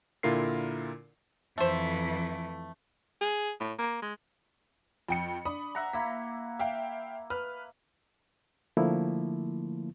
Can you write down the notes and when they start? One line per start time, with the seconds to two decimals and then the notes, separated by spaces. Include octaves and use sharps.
0.23 A#2 D3 E4 F4 A#4 C7
1.58 F2 E3 A3 C5
3.21 G#4
3.60 A2
3.79 A#3
4.02 G#3
5.09 F2 G5 C#7
5.45 D4 B5 D#6
5.75 E5 F#5 A#5
5.93 A#3 E4 B6
6.59 E5 F5 G5
7.30 B4 F6
8.77 D3 F3 A3 A#3 E4